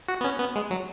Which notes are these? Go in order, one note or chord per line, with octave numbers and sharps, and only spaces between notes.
F#4
B3
C#4
B3
G#3
F#3